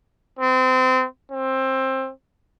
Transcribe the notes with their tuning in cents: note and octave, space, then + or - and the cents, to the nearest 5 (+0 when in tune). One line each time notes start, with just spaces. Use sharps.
C4 -25
C4 +20